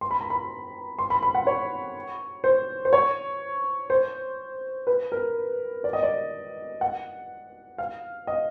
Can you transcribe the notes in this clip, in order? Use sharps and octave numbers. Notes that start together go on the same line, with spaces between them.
C6
B5
A#5
B5
C6
B5
B5
F#5
C#5
C5
C5
C#5
C5
B4
A#4
D5
D#5
D5
F#5
F5
D#5